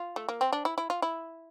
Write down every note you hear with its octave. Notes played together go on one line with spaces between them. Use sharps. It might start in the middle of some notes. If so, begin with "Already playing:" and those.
Already playing: F4
A3
A#3
C4
D4
E4
E4
F4
E4